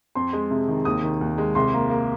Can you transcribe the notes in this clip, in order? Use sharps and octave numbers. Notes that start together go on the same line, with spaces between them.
F2 C6
G#3
C3
D#3
D#2 D#6
D#3
D#2
G#3
C2 C6
A#3
A#3